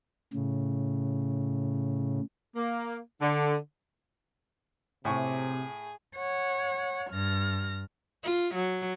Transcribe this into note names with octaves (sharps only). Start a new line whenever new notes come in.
A2 C#3
A#3
D3
A2 C3 G#4 G#5 C#6
C#5 F#5
G2 F6 A#6
F4
F#3